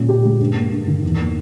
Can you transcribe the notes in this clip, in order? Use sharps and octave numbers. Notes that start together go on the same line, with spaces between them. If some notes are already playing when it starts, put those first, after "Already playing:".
Already playing: A#2 G#3 C#4
G4
G#3
G2
A#3
G2
D#3
E2
A#3